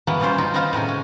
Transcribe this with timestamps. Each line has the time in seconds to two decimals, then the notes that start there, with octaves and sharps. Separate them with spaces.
0.07 E3 F#3 A#3 B3
0.20 E3 G3 C4 C#4 F4 C5
0.38 B2 D#4 F4 G5
0.54 B3 C4 D#4 F4 C5
0.73 A2 C#3 D#4 G#5
0.88 C#4